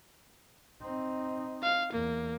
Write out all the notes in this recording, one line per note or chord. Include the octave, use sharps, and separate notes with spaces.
C4 D#4
F5
E2 A#3